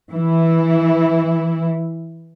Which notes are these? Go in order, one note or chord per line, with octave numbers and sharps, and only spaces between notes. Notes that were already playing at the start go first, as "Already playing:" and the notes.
E3 E4